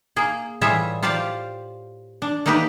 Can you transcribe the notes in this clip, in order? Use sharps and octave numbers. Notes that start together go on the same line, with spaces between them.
A#3 G#4
A2 E3 G3 F4 G#4 E5
F4 G4 C5 D5 F5
D4
A3 A#3 D#4 G4 B4